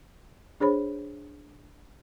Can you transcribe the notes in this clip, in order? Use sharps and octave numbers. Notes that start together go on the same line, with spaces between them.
D4 G#4 C5 C#5 B5